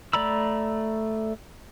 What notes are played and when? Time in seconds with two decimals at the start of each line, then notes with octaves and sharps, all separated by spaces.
0.13 A3 D5 A#5 B5 E6